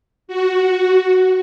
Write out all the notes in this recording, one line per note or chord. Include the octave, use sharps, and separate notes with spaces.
F#4